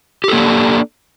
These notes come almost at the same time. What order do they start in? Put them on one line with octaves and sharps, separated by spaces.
G4 A4 A#3 D4